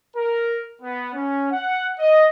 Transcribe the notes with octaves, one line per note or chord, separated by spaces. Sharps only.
A#4
B3
C#4
F#5
D#5